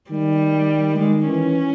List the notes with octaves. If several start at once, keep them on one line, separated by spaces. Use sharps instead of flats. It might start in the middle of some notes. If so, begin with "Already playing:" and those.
D#3 G3
D#3 G#3
E3 C#4